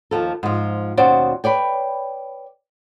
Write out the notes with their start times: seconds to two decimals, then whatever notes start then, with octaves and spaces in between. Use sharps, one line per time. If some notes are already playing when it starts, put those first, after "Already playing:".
0.11 D#2 F3 A4
0.43 G#2 F3
0.97 D#2 B2 C#4 F#4 C5 D5
1.44 B4 C#5 D5 G5